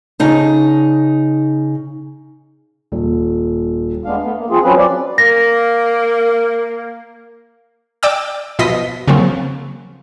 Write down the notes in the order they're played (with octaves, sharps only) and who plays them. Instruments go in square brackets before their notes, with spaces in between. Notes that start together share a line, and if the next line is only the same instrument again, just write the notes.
[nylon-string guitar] C#3 D#4 A5
[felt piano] D#1
[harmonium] G#3 B3 D4 F5
A3 B3
A#3
F3 C4 F4 G#4
F3 F#3 C4 C#4 B4
D5
[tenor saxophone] A#3 [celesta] A#6
[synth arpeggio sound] D5 G5 D6 E6
B2 F3 D#5 B6
C#3 F3 F#3 A#3 C4